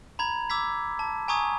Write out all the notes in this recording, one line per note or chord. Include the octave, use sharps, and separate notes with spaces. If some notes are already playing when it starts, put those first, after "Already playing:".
A#5 B5 G#6
D6 E6 G#6 B6
A5
G#5 A#5 C#6 D#6 G#6